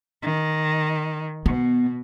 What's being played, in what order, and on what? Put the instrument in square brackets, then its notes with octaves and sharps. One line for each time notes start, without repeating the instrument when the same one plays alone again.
[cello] D#3
[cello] B2 [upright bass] B3